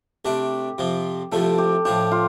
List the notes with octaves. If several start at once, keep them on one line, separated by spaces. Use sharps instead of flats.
C3 A3 D4 G4
F2 C3 F3
C2 C3 F3 A3 A4
G4
A2 F3 D4 G4
F4